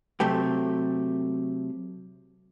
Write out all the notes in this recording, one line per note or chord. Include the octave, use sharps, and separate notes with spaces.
C3 F#3 A3 G4